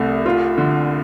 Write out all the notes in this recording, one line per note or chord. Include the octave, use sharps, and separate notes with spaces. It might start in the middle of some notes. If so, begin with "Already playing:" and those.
Already playing: C2 C3 A3
F4
D3